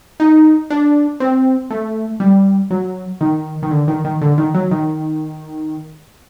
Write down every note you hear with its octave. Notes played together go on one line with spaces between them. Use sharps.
D#4
D4
C4
A3
G3
F#3
D#3
D#3
D3
D#3
D#3
D3
D#3
F#3
D#3